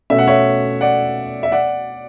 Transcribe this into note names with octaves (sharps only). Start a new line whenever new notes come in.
B2 A3 C#4 E5
F#5
C#5 E5
D5 F#5
E5
D5 F#5